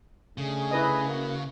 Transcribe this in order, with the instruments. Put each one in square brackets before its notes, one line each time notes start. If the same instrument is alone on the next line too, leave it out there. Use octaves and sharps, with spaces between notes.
[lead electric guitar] C#3 [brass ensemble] A3 D4 G#4
[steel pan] E4 B4 D#5
[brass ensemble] A#3 F#4